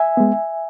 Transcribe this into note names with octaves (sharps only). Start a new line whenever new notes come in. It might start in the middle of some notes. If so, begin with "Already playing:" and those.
Already playing: E5 G#5
G#3 B3